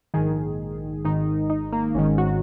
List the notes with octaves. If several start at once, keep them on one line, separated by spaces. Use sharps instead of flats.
A#1 G#2 D#3 G#4
G#1 G#2 D#3 D#4
D#4
A#3
G#1 G#2 D#3 C#4
F#4